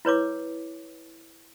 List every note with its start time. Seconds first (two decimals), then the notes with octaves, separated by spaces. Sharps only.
0.05 E4 B4 C#5 D6